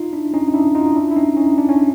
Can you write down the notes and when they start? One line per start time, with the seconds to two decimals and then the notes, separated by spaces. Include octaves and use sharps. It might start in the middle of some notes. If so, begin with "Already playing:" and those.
Already playing: D#4 F4
0.13 D4 E4
0.34 C#4 D#4
0.48 D#4
0.54 D4 E4
0.75 D#4 F4
0.96 D4 E4
1.11 E4
1.16 C#4 D#4
1.37 C#4 D#4
1.58 D4
1.69 C#4